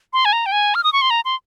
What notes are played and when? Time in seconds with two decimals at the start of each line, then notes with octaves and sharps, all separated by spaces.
0.13 C6
0.25 G#5
0.33 A#5
0.46 G5
0.52 G#5
0.75 F6
0.84 D#6
0.93 C#6
1.02 C6
1.10 A#5
1.25 C6